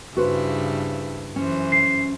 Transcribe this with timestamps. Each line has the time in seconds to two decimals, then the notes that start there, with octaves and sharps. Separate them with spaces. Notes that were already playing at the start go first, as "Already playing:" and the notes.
0.17 G2 C#3 E4 F#4 B4 C5
1.36 F#2 E3 C#4 C5
1.72 C7